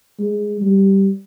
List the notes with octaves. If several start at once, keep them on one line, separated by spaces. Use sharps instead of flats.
G#3
G3